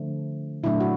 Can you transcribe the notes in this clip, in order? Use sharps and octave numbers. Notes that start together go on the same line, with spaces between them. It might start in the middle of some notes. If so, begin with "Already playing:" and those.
Already playing: D3 F3 A3 D4
A#2 F#3 A3 D4 E4
F#4